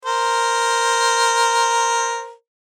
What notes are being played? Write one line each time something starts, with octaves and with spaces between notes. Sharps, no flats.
A#4 C5